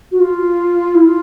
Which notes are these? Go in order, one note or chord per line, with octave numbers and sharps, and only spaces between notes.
F#4
F4
E4
F4